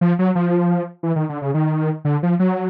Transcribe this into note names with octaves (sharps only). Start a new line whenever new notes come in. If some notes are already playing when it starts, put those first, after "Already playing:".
F3
F#3
F3
E3
D#3
D3
C#3
D#3
D3
F3
F#3